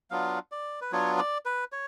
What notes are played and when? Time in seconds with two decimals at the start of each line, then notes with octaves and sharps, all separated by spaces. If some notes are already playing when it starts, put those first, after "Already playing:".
0.11 F#3 B3 D4 F4 F5
0.52 D5
0.81 B4
0.92 F#3 B3 D4 F4 C#5
1.19 D5
1.46 B4
1.72 C#5